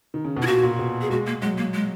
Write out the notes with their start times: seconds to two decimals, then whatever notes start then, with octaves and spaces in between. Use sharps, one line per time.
0.14 D#3
0.24 C#3
0.37 B2
0.42 E4
0.47 A#2 F#4
0.63 A#2
0.79 B2
1.01 G#4
1.10 G#3 F#4
1.27 A#3
1.42 F#3 G#3
1.58 A#3
1.74 G#3